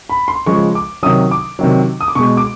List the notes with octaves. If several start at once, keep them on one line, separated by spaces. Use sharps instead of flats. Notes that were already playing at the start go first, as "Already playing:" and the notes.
B5
C6
C#3 F3 G#3 C#6
D6
C3 D#3 F#3 D#6
D6
C3 D#3 F#3
D#6
D6
B2 G#3 C#6
D6